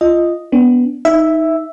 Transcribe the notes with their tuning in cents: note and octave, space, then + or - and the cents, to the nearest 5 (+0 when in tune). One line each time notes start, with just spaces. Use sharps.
F4 -20 D#5 +0
B3 +0 D4 -20
D#4 +20 E5 +0